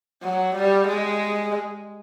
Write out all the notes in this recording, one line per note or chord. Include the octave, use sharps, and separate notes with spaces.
F#3
G3
G#3